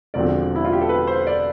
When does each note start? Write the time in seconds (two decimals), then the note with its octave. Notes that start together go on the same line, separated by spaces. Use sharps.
0.14 E1 E2 D3 F3 C4 D5
0.56 E4
0.65 F4
0.73 G4
0.81 A4
0.89 B4
1.07 C5
1.27 D5